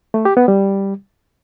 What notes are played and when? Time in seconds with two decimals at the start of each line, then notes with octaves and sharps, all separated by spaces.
0.14 A3
0.25 G4
0.37 B3
0.48 G3